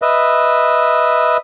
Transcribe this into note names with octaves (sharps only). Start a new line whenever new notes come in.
B4 D#5 E5